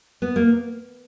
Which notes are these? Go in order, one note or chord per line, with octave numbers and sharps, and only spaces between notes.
B3
A#3